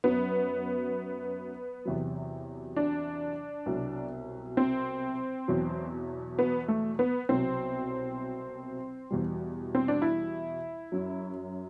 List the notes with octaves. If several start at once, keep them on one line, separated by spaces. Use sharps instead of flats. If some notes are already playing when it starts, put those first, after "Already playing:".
F#2 F#3 B3
E2 C3 F#3
D4
C2 B2 F#3
C4
E2 B2 F#3
B3
A3
B3
C2 B2 F#3 C4
E2 B2 G3
C4
D4
E4
F#2 F#3